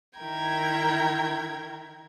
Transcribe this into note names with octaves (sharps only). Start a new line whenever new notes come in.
D#3 E4 A#4 G5 A#5 G#6